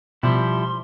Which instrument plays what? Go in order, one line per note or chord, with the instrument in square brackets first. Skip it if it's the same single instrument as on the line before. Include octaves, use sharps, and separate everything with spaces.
[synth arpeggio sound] B2 [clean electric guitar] F3 G3 E4 [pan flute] C6